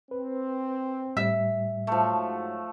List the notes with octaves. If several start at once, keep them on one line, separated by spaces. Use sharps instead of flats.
C4 B4
A2 G3 E5
G#2 F3 F#3 A3